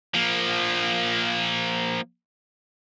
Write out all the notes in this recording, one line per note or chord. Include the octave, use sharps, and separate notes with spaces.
F3 A#3